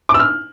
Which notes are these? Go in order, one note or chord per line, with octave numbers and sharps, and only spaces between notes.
D6
E6
F6